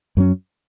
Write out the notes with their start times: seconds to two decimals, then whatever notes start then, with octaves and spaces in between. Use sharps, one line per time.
0.17 F#2 F#3 C#4